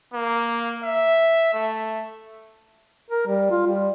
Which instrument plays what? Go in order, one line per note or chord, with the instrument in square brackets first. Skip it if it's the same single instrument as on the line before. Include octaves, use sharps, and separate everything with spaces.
[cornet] A#3
E5
A3
[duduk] A#4
G3
F4
G3